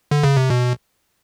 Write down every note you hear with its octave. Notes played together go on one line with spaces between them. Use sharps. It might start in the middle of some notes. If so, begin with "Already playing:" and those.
D3
C#3
C3
B2